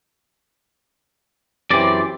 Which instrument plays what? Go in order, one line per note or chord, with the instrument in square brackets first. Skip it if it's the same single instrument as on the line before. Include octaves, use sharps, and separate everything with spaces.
[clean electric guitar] F#2 D5 [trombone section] E3 C4 G4